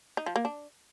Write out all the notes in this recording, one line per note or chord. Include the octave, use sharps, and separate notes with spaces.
D#4
F3
A#3
D4